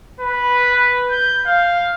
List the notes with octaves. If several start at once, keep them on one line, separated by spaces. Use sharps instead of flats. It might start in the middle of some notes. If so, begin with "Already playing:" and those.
B4
G6
F5